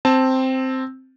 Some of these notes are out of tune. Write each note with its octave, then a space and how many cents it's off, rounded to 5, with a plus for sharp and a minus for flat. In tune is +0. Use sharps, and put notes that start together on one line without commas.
C4 +0 A5 +0